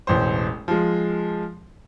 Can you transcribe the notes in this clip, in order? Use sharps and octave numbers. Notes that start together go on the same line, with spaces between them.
E1 A1 C5
F3 G#3